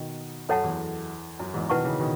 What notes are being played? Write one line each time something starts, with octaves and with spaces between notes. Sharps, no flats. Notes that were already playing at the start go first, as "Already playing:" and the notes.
Already playing: B2 D#3
F#2 A4 C#5 F#5 A5
E2
F#2
E2 G#2
B2 D#3 E4 B4 F#5 A5 C#6
C#3 E3
B2 D#3